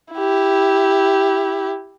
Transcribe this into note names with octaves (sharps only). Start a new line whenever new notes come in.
E4 G4